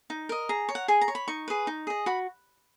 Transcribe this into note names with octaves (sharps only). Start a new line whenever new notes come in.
D#4
A#4 D#5
G#4 A#5
C#5
F#5
G#4 G#5
A#5
C#5
B5
D#4 C#6
G#4 B4
D#4
G#4 D#5
F#4 B5